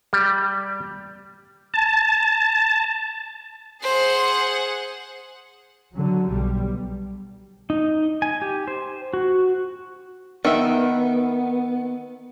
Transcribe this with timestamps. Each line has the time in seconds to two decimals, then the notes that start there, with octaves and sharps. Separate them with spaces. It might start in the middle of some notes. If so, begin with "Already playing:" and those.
0.13 G3
1.74 A5
3.83 G#4 C5 F#5
5.96 D3 F#3
6.29 B1 G3
7.70 D#4
8.22 G#5
8.42 G4
8.68 C5
9.13 F#4
10.45 D#3 B3 E5